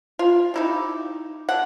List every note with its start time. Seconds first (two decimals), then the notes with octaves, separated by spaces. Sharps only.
0.19 F4
0.54 D#4 E4 G4
1.49 D3 F#5